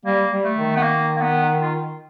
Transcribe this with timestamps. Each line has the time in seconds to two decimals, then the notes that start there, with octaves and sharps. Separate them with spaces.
0.05 G3 A#3
0.31 G3
0.44 A3
0.57 D#3
0.76 B3
0.83 A#3
1.16 A#3
1.21 B3
1.61 F4